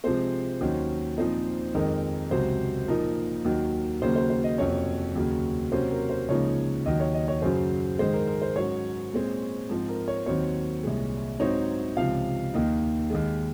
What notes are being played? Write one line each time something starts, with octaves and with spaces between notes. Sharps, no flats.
C3 F3 G#3 C4 C5
D#2 D#3 F#3 C#4
A#2 F3 C4 D#4 C5
F2 D#3 G#3 D#4 A#4
C#2 C3 F#3 C5
A#2 F3 A#3 D#4 A#4
D#2 D#3 F#3
D#2 C#3 F#3 A#3 C5
C5
C5
D#5
F2 C3 F#3 A#3 C#4 C#5
D#2 C#3 F#3 A#3
C3 F#3 A#3 C#4 C5
A#4
C5
C#2 C#3 F3 A#3 D#4 C#5
D#2 D#3 F#3 D#5
C#5
D#5
C#5
F#2 C#3 F#3 C5
G#2 D#3 G#3 C5
A#4
A#4
C5
G#2 F#3 C#4 C#5
A#2 G#3 C4
G#2 F3 C4
A#4
C#5
D#2 D#3 F#3 C4 C#5
C2 A#2 G#3
G#2 F#3 C4 D#4 C#5
C#2 C3 F3 F5
D#2 D#3 A#3 D#4
D#2 D#3 G#3